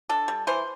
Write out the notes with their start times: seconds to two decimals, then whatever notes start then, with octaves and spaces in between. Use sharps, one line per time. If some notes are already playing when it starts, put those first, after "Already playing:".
0.09 D4 A4
0.28 G3
0.47 E3 C5